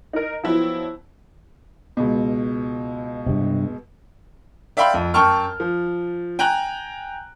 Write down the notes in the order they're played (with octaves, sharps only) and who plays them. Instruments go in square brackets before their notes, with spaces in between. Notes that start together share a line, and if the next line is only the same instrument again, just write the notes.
[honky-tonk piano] D#4 A#4
F3 F#3 B3 C4 E4
[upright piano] C#2 B2
[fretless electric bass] G2 C3
[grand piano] D5 E5 F5 G5 B5 C6
F2
F#2 G5 A5 C#6 F6
F3
G5 G#5 A#5 F#6